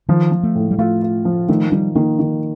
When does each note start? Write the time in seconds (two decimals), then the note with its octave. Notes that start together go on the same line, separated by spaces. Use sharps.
0.09 D#3 F3
0.32 F3
0.43 A3
0.55 A2
0.71 G3
0.78 A3 F4
1.02 F4
1.25 F3
1.49 D#3 A3
1.72 D#3 G3
1.95 D#3 A#3
2.19 D#3